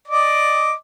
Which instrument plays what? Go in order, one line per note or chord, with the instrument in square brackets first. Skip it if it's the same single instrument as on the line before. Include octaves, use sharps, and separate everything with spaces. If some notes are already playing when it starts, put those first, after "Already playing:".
[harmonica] D5 D#5 D6